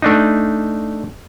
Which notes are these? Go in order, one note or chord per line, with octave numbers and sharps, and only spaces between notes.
A3 D4 D#4